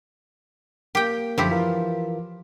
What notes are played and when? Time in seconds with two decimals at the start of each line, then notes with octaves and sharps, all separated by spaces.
0.95 A#3 G4 A#4 G5
1.38 F#2 D3 F3 E4 G4
1.51 E3 F4 A#4